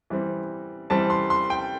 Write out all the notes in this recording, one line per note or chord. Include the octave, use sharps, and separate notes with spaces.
E3 G3 C4
E3 G3 C4 A5
C6
C6
G5